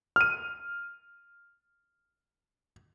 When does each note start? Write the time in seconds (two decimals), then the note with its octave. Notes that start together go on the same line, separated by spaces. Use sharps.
0.16 F6 D#7